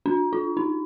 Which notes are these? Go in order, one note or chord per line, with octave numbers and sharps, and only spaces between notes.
D4
F4
D#4